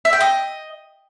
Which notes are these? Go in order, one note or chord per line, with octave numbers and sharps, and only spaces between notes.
E5
G5
D#5